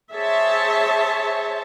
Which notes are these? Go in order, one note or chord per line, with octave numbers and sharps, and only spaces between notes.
G#4 C5 C#5 E5 A5